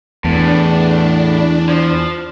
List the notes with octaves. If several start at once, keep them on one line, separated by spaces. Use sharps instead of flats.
E2 A2 D4
F3